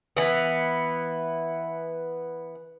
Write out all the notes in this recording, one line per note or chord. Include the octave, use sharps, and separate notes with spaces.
E3 B3